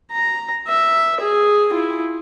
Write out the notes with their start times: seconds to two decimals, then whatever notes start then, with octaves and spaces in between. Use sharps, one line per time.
0.11 A#5
0.68 E5
1.21 G#4
1.73 E4 F4